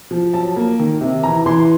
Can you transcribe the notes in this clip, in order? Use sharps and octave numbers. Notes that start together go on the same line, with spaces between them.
F3
F#3 A5
A#3
D#3
C3
E3 A#5
E3 C6